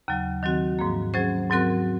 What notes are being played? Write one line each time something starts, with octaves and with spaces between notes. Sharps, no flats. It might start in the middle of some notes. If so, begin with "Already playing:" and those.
D#2 C#3 F#3
D#3 F#3 C4 F#4
G#2 F3 A#3
F#3 C#4 G#4 C5
G#2 F#3 C4 F#4 A#4